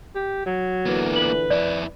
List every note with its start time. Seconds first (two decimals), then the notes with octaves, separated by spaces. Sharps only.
0.15 G4
0.46 F#3
0.85 A#2 D3 E3 A#3 B3
1.16 B4 F#7
1.50 F2 E4 D5